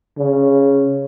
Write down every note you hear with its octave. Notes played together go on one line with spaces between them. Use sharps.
C#3